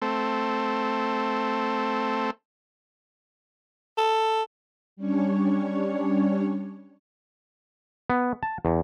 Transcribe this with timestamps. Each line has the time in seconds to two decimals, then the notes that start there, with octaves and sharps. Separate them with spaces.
0.02 A3 C4
3.98 A4
4.96 G3 C#4 D4 C#5
8.10 B3
8.43 A5
8.65 E2